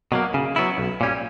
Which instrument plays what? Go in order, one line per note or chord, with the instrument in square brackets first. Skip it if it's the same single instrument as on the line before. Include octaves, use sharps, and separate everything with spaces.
[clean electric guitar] B2 F#3 A#3
C#3
F#3 B3 E4
B1
A#2 G3 C#4